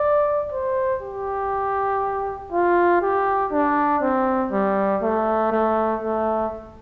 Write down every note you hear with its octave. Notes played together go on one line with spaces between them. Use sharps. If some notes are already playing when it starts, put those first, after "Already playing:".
Already playing: D5
C5
G4
F4
G4
D4
C4
G3
A3
A3
A3